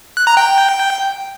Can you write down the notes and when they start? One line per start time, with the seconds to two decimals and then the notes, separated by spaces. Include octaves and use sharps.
0.17 F#6
0.27 A#5
0.37 G5
0.47 G5